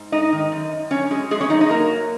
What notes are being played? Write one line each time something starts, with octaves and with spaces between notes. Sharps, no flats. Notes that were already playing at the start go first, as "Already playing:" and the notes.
Already playing: G#2
G#3 D#4 D#5
D#3
F#2
F#2
F#2 C#4 C#5
F#3 G#3 G#4
F#2 G#3 G#4
C#4 C#5
F#2 D#4 D#5
D#4 D#5
F#3 A#3 A#4
F#2